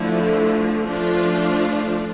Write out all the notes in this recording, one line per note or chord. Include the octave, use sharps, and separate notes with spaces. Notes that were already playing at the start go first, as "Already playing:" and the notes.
Already playing: D3 F3 A3 E4
F3 A3 D4 F4